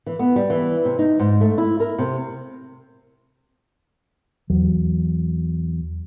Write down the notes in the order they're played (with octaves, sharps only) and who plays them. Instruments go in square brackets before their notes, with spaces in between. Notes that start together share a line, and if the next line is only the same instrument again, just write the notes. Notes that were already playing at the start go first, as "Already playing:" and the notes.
[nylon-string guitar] E3
B3
G3
E3
C3
D#4
G#2
A3
E4
A#4
C3
[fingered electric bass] E2 F#3